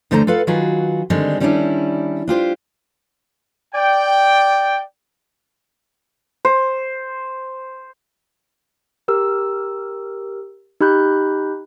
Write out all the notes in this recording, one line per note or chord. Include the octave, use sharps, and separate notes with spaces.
D2 D3 A3 C5 F#5 A#5
F4 A4 B4 F5 F#5
D#3 F#3 F4 F#4 G#4 B4
D3 D#3 G3 G#3 C4
D#3 G3 B3 C#4 D4 E4
D4 F4 G4 C5
D5 G5
C5
G4 A#4 E6
D#4 G4 B5 F#6 G6